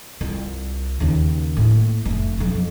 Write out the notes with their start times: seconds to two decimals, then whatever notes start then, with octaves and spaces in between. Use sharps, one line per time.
0.21 C2 F4
1.00 D#2 C#3
1.57 A2 A#3
2.05 F1 A3
2.38 B1 F2